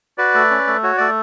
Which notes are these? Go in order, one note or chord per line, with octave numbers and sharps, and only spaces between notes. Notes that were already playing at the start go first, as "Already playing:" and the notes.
F#4 B4 D5
A3
C#4
A3
F#4 C#5
A3 D5